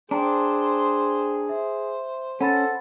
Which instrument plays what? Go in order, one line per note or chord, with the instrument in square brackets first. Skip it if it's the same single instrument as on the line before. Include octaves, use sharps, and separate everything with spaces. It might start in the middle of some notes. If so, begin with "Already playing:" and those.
[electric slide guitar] D4 [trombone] G#4 [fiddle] C5 C6 [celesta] G5 A#5
[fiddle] C5 [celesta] E5
[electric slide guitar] C#4 [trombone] A4 [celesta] F#5 B5 A6